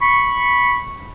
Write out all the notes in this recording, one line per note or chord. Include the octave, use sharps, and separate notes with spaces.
B5 C#6